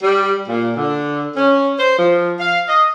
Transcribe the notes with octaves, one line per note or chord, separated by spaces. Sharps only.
G3
A#2
D3
C#4
C5
F3
F5
D#5